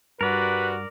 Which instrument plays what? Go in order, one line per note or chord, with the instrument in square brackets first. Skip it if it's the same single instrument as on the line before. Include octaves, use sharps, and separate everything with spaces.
[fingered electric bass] G2 [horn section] G3 F#4 [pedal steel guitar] A#4 D5 [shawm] B4